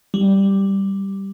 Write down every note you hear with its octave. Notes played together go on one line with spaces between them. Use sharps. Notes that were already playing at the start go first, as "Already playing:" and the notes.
G3